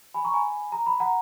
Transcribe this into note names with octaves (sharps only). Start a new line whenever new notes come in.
G#5 B5
A#5 C#6
G#5 B5
A#5
B5
F#5 A#5